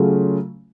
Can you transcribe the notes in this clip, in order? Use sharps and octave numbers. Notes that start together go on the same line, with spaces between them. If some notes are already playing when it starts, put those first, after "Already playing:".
Already playing: C#3 F#3 A3 C#4 F4